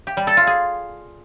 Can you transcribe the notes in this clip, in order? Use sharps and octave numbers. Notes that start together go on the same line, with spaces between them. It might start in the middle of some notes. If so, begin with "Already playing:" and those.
G4
G3
A4
F4
G#4